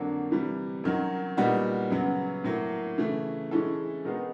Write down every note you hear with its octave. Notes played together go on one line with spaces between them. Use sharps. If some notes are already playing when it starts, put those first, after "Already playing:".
Already playing: F2 D3 F#3 A#3 D4
C3 E3 G3
F#2 D#3 F#3
A#2 G3 B3 D#4 F#4
F#2 C#3 F#3 B3
A2 F#3 A#3
C#3 E3 A3
E3 G#3 C#4 E4 A4
D#3 G#3 B3 D#4 G#4